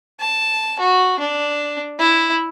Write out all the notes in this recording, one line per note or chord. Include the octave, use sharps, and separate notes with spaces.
A5
F#4
D4
E4